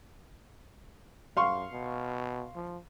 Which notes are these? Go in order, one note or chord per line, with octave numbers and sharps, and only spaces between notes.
F#2 F5 C6 C#6
B2
F3